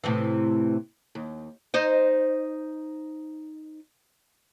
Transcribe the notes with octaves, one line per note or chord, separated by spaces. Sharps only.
A2 C3 E3
D#2
D#4 C5 D#5